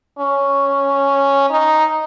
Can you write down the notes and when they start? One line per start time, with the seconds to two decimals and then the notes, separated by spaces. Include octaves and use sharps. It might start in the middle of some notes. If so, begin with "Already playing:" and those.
0.19 C#4
1.50 D#4